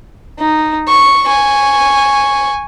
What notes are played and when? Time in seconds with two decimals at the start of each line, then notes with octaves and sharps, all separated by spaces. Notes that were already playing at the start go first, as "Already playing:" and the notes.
0.39 D#4
0.88 C#6
1.27 G#5 C#6